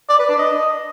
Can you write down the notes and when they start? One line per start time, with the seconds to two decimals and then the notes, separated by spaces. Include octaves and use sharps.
0.09 D5
0.19 B4
0.29 D4
0.39 D#5